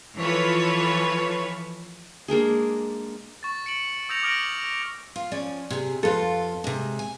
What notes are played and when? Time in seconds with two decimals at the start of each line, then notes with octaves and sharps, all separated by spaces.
0.18 E3 F3 F4 A4 B4 C#5
2.28 G#3 A#3 D4 G#4
3.43 C#6 A6
3.66 C#7 D7 F#7
4.09 D#6 E6 G6 A#6 C#7 F7
4.23 D6 D#6 F6 A#6 D7 F#7
5.16 F4
5.32 F3 C#4 D5
5.70 C3 G#4
6.03 F2 F4 A4 B4
6.64 C3 G#3
6.99 G#5